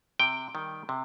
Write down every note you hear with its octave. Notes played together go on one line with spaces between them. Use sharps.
C3 G5
D#3 G3
C3